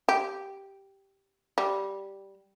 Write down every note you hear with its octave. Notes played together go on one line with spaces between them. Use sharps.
G4
G3